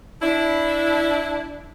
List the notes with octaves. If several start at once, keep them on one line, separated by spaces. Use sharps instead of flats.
D4 E4